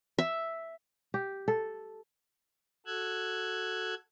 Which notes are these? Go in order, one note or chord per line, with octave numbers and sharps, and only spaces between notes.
E5
G4
A4
F#4 A4 E6 F#6 G#6